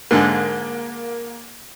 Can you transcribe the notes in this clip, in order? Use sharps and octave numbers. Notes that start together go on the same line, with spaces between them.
G#2 D3 G#3 A#3